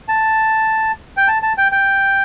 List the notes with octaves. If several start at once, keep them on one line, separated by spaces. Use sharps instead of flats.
A5
G5
A5
A5
G5
G5